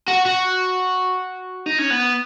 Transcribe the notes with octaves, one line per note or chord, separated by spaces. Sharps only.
F#4
F#4
D#4
C#4
B3